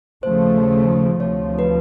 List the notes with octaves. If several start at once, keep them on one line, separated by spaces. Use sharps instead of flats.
D#2 C#3 F3 A3 C5
D2 C3 F3 C#5
B4